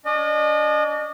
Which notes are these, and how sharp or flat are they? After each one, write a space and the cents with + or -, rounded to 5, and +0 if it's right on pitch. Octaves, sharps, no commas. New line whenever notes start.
D4 -40 D#5 -35